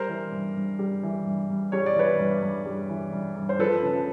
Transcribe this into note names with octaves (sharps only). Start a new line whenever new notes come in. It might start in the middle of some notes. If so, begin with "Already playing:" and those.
Already playing: G3 A#4 C5
E3
G2
G2
G3
E3
G2
G2
G3 C#5
D5
E3 B4 C#5
G2
G2
G3
E3
G2
G2
C5
F3 A4 B4
C#3